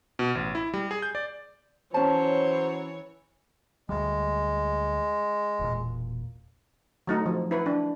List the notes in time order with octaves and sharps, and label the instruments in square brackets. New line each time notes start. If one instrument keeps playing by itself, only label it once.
[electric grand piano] B2
A1
E4
G3
G#4
G6
D5
[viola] E3 C#5 [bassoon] F#3 [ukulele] C#4 A5 [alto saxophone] C5
[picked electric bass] D2 G3 [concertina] G#3
[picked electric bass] E1 A#2
[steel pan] F#3 A3 D#4
F3
E4 B4
D4